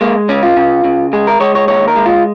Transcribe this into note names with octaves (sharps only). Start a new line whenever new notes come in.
G#3 A#3
C#3 C#4
F4
C#3
C#3
G#3 G#4
A#4
G#3 C#5
C#5
D#2 C#5
A#4
G#3
F4